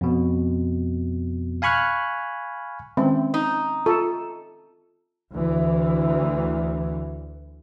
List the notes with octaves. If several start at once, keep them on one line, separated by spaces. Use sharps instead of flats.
F2 B2
F5 G#5 B5 C#6 F6 F#6
D#3 G#3 C4 C#4
D#4
F4 A4
D2 E3